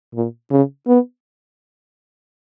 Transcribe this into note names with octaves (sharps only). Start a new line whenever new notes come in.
A#2
C#3
B3